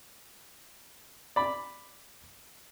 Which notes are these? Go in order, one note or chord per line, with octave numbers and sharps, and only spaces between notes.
D5 B5